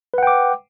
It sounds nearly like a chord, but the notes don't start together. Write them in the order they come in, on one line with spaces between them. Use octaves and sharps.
B4 F#5 G5 D6